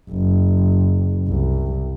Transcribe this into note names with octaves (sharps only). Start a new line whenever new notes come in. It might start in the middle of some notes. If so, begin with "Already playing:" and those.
F#1
C2